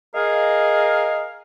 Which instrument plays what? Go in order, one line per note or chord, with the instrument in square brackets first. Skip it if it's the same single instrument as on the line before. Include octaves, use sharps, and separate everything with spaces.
[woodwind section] G#4 A#4 F5 [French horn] D#5